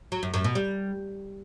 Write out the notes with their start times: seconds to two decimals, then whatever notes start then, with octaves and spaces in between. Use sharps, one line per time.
0.12 F#3
0.23 F#2
0.34 F#2
0.44 B2
0.55 G3